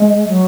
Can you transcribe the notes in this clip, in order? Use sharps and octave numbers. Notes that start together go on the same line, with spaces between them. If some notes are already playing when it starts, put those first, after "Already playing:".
Already playing: G#3
F#3